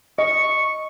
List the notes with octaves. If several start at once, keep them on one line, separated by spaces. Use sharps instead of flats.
D#5 C#6